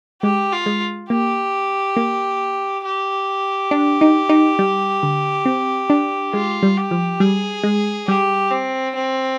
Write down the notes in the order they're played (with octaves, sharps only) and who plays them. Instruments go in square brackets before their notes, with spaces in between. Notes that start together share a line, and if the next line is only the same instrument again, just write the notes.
[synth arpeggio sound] G#3 [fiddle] G4
[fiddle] F4
[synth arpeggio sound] G#3
[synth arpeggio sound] A#3 [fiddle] G4
[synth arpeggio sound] A#3
[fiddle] G4
[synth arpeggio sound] D4
D#4
D#4
G3
D3
C4
D4
[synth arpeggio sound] G#3 [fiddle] F4
[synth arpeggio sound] G3
[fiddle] G4
[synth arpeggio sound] F3
[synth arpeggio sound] G3 [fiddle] G#4
[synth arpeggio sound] G#3
[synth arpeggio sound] G3 [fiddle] G4
[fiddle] C4
C4